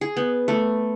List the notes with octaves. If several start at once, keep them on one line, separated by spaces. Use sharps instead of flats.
G#4
B3
A3